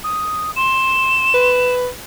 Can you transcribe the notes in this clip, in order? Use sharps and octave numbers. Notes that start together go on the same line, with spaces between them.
D#6
C6 E7
B4